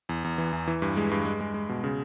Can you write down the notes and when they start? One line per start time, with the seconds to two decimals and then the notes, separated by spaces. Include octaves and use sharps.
0.09 E2
0.24 E2
0.38 E3
0.53 E2
0.67 E3
0.82 G2
0.97 G#3
1.11 G2
1.25 G#3
1.41 G#3
1.54 G#3
1.69 B2
1.84 C#3